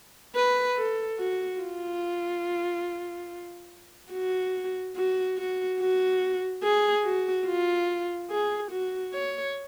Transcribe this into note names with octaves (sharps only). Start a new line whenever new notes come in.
B4
A4
F#4
F4
F#4
F#4
F#4
F#4
G#4
F#4
F4
G#4
F#4
C#5